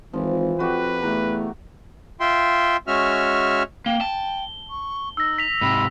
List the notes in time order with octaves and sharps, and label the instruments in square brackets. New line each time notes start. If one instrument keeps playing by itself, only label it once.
[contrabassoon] G#1 [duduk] E3 [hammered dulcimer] F3
[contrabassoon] F2 [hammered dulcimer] F#4 G4 [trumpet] B4
[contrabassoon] E2 [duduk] A3 [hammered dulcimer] A#5
[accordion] F4 E5 G5 C6
G#3 C#4 F#4 E5 F6
[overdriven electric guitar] A#3 [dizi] G5 [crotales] G7
[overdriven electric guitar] A5
[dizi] C#6
[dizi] D#4 [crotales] E6 A#6
[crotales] B6 F7
[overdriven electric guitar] G#2 C3 [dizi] B5